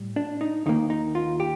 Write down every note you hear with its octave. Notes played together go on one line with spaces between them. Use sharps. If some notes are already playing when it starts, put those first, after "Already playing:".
Already playing: A2 G3
D4
D#4
D#2 D#3 A#3 D#4
D#4
F4
G4